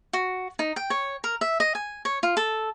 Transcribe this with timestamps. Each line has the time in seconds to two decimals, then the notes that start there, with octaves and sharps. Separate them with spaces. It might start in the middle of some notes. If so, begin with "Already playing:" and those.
0.13 F#4
0.59 D#4
0.76 G5
0.90 C#5
1.24 A#4
1.41 E5
1.60 D#5
1.75 G#5
2.05 C#5
2.23 F4
2.37 A4